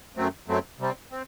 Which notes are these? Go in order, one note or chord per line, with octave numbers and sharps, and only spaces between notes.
F#2 F#3 A3 C4
F#2 F#3 A3 C4
C3 G3 C4
C4